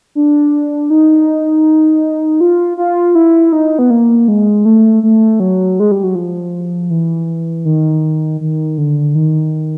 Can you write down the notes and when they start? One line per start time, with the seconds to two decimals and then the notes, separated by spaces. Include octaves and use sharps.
0.15 D4
0.90 D#4
2.41 F4
2.77 F4
3.15 E4
3.52 D#4
3.79 B3
3.90 A#3
4.28 G#3
4.65 A3
5.03 A3
5.40 F#3
5.80 G#3
5.91 G3
6.03 F#3
6.15 F3
6.90 E3
7.65 D#3
8.41 D#3
8.78 D3
9.15 D#3